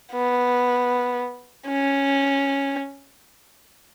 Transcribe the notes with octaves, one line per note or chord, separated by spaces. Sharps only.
B3
C#4